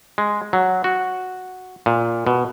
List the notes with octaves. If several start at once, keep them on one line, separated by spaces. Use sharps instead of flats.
G#3
F#3
F#4
A#2
B2